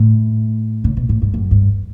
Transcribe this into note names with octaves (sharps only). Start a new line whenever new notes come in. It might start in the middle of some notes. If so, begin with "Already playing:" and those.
Already playing: A2
C#3
B2
A2
G2
F#2
G2